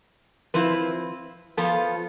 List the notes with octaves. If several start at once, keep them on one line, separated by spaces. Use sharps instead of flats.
F3 C4 E4 B4
F3 B3 F4 A4